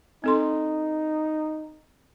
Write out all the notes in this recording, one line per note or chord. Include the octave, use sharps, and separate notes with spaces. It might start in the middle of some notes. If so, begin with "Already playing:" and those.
C4 D#4 A4 C6